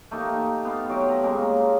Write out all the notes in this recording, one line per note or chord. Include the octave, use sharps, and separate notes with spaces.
A3 A#3 D#4 G4
B3 F5
F#3 F4 G4 D6
B4 A#5
C#3 G#3 A#3